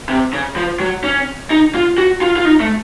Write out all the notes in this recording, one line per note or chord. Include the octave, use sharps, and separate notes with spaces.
C3
C#3
F3
F#3
C#4
D#4
F4
F#4
F4
F4
D#4
A3